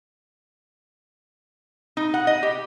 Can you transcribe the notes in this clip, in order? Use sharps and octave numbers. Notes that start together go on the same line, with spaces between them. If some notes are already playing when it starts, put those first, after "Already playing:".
D#4
F#5
D#5
G4